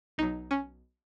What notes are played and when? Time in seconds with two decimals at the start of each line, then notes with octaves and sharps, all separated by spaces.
0.18 B1 B2 F#3 D#4
0.51 C#4